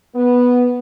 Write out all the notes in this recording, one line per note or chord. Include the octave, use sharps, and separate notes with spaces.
B3